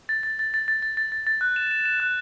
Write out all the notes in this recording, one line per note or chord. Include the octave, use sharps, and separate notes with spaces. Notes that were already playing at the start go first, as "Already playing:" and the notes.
A6
A6
A6
A6
A6
A6
A6
A6
A6
F#6
E7
E7
E7
F#6